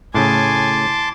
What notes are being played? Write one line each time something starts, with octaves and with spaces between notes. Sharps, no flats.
A2 C#3 G#5 A5 C6 D6